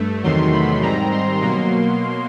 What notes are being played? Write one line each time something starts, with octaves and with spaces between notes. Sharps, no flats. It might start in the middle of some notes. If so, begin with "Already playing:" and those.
Already playing: G2 A3
E2 C3 D#3 F#3 A3 C6
B5
G#2 D#3 G3 C4 A#5
C6
B2 F#3 A#3